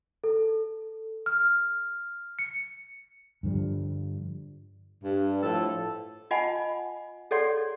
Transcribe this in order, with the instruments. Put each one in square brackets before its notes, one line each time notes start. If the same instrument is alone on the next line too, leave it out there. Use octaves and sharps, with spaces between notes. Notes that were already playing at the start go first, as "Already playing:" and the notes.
[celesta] A4
F6
C#7
[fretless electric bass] G2 D3 F3 G3
[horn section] G2
A2 F3 A4
[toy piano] F4 D#5 F#5 G#5 A5 B5
G#4 A4 C#5 D5 F#5 C6